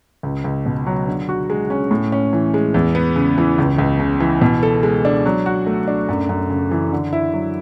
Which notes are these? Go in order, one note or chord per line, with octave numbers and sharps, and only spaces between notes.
C#2
C#2
B2
F#3
D3
F#4
G#3
C#4
A2
C#4
E3
G#3
E2
B3
C#3
E3
C#2
C#2
C#3
E3
B2
A4
G#3
D4
F#3
F#4
A3
D4
F#2
F#2
C#3
E3
D3
E4
F#3